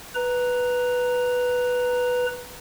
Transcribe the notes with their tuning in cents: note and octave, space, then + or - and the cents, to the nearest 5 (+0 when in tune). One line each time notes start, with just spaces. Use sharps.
B4 +0 A#5 +0